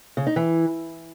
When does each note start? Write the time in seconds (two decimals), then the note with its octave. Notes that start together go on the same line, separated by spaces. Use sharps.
0.17 C#3
0.27 D#4
0.36 E3